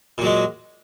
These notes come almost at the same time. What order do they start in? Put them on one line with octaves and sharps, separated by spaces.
A#2 F#3 G#3